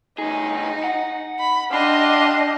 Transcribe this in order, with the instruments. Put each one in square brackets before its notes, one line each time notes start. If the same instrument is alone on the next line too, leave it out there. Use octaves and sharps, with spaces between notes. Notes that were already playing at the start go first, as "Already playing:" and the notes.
[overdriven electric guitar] D2 G#4 [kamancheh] D#4
[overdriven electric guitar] F#5
[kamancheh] B5
[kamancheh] D4 D#5 [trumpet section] G4 F5 C6